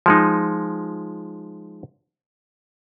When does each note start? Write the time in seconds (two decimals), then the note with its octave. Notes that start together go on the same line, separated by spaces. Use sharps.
0.06 F3 G#3 D#4